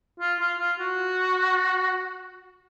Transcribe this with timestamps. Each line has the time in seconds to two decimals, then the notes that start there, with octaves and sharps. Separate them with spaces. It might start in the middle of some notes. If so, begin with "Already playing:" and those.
0.20 F4
0.40 F4
0.59 F4
0.79 F#4